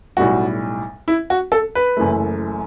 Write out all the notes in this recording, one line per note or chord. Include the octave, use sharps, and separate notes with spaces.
B1 A2 G3 F#4
E4
F#4
A4
B4
F#1 F#2 E3 A3